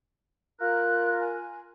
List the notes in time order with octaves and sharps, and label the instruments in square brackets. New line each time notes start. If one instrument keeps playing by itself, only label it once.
[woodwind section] F4 A#4 [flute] F#6
[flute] G#5